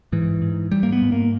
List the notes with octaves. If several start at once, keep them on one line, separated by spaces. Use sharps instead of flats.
G#2 E3
G#2
G#2 G3
A#3
B3
G#2
A#3